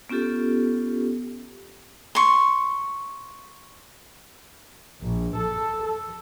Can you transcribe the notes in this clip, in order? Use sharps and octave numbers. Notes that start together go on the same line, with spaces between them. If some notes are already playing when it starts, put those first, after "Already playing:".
B3 C#4 F4 G4 A4
C6 C#6
A#1
A4
A4